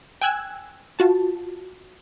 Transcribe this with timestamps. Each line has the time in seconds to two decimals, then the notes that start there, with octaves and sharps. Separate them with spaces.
0.21 G5 G#5 E6 F#6 G#6
0.99 F4 F#4 A5